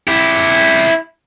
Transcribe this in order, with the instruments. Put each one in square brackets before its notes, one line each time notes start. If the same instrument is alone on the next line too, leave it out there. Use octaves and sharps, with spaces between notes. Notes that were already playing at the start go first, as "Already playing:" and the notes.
[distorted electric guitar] E4 G4